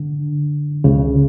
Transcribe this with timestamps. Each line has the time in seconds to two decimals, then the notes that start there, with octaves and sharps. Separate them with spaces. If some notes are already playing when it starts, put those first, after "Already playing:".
Already playing: D3
0.84 C#2 C#3